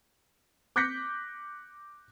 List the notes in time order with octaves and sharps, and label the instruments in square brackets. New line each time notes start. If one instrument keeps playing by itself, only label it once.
[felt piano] D6 F#6 G6 A#6 B6 C#7